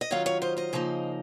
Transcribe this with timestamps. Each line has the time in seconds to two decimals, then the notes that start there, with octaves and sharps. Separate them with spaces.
0.01 D#5
0.11 D#3 F#3 C#4 F4 C#5 F5
0.26 C#5 F5
0.42 C5 D#5
0.57 C5 D#5
0.73 C#3 F3 A#3 D#4